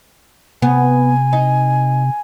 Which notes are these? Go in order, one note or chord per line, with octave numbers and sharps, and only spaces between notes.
C3 B3 G#5
D#4